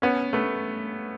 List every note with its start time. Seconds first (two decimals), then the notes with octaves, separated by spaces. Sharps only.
0.02 B3 C#4
0.33 A3 B3